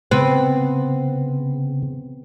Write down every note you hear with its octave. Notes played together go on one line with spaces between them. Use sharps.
C#3 B3 C4